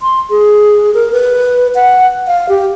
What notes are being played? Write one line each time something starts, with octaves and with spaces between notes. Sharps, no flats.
C6
G#4
A#4
B4
F#5
F5
G4